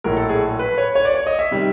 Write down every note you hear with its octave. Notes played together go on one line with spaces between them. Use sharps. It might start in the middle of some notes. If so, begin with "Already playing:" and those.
A#1 A2 F#3 A#4
A4
G#4
B4
C#5
C#5
D5
C#5
D#5
E5
C3 D#3 G3